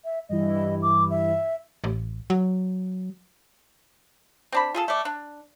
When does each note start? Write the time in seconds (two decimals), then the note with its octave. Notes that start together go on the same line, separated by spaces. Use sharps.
0.04 E5
0.29 G2 E3 E4 D#5
0.82 D6
1.10 E5
1.84 A1
2.30 F#3
4.52 C4 D4 B5
4.74 F4 G#4 A4
4.88 A3 D5
5.05 D4